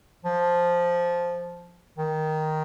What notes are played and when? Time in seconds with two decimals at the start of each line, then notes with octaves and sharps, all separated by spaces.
0.25 F3
1.98 D#3